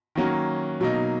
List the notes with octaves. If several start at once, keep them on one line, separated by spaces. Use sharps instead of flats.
D#3 F#3 A#3 C#4 F#4
B2 F#3 A#3 D#4